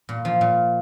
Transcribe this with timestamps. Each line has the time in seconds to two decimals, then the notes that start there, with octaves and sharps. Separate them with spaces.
0.09 A#2
0.25 F3
0.41 A#2